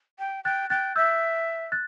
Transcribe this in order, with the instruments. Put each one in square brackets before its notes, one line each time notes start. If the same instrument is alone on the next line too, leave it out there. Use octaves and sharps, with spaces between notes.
[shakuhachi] G5
[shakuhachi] G5 [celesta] F#6 A6
[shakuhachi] G5 [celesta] F#6 A6
[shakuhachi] E5 [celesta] E6 G6
[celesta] F#6 A6